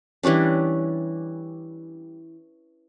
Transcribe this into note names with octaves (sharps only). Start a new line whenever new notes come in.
E3 G3 C#4 D4